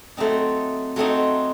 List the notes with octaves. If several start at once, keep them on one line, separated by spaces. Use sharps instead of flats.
F#3 A3 C4 D#4
F#3 A3 C4 D#4